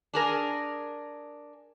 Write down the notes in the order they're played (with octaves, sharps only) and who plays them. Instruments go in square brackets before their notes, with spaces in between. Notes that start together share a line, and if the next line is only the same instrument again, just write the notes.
[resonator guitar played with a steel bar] D4 G#4 A#4